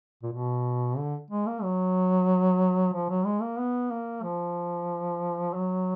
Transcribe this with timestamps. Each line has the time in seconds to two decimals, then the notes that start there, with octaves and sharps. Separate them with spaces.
0.23 A#2
0.32 B2
0.98 D3
1.31 G#3
1.47 A#3
1.63 F#3
2.94 F3
3.10 F#3
3.25 G#3
3.42 A#3
3.58 B3
3.91 A#3
4.23 F3
5.54 F#3